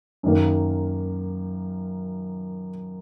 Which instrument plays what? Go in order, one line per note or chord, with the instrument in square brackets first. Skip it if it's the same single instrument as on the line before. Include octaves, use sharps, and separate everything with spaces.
[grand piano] F#2 D#3 A#3